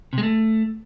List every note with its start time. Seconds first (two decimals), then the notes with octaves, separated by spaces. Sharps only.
0.13 C3
0.18 G#3
0.23 A3